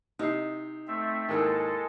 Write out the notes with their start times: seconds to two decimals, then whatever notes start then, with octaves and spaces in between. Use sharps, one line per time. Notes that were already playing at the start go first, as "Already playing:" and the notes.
0.19 C3 D#4 D#6 C7
0.88 A3 C4 E5
1.29 D#2 G#2 G#3 E4 A4 A#4 G5 E6